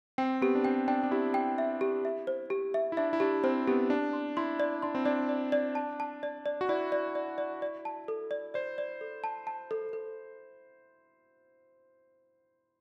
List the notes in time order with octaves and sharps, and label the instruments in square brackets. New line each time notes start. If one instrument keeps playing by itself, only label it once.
[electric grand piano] C4 [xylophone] G5
[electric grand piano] B3 [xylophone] G4
[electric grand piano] D4
[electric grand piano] C4 [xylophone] G5
[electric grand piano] D4 [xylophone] G5
[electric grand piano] D4
[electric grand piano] E4 [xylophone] G4
[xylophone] G5
E5
G4
E5
C5
G4
E5
[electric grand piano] E4
[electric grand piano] D4 [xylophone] E5
[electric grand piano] E4
[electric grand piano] D4 [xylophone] G4
[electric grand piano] C4 [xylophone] C5
[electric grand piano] B3 [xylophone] G4
[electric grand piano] D4 [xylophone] A5
[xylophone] C6
[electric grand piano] E4 [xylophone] C6
[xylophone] D5
[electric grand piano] D4 [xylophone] C6
[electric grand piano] C4
[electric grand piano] D4 [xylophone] D5
[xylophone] D5
D5
A5
A5
D5
D5
[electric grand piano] F#4
[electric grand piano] E4 [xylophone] D5
[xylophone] D5
D5
D5
D5
A5
A4
D5
[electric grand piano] C5 [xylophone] D5
[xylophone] D5
A4
A5
A5
A4
A4